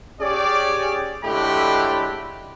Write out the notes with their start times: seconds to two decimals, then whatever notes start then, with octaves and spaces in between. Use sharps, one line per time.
0.21 C#4 G4 G#4 C#5 D5
1.24 A2 D3 G#3 F#4 G4 B5